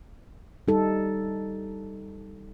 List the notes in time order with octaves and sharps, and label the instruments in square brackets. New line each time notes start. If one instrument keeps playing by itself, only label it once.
[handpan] G3 D#4 A4